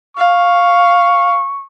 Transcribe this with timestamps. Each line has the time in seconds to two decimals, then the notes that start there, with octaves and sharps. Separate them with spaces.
0.17 F5 C#6